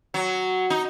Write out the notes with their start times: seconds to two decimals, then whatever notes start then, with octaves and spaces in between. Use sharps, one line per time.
0.14 F#3
0.70 D#4